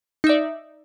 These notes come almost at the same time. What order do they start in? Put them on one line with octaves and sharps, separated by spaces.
D#4 E5 D5